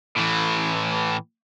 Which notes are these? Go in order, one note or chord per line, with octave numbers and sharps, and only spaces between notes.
A2 E3